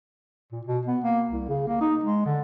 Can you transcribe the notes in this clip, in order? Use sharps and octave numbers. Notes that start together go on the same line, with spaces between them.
A#2
B2
B3
A#3
C2
C#3
A#3
D#4
G#3
D3